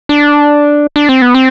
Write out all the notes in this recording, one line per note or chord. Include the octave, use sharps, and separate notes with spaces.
D4
D4
C4
B3
C4